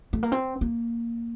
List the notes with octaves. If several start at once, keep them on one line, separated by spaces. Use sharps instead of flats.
A3
A#3
C4
A#3